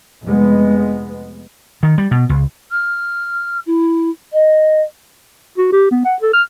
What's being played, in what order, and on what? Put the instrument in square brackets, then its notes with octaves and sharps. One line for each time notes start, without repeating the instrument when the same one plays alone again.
[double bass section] F1 G#3 B3
[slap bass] D#3
G3
B2
C#2
[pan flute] F6
E4
D#5
[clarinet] F#4
G4
B3
F#5
A4
F6